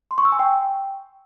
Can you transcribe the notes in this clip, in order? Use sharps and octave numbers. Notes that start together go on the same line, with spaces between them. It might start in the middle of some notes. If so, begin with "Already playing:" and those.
C6
C#6
E6
G#5
G5